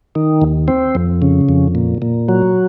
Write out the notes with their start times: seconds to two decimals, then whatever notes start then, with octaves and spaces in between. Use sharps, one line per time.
0.15 D#3
0.42 D#2
0.68 C4
0.95 F2
1.22 C#3
1.49 F2
1.75 A#2
2.02 A#2
2.29 F#3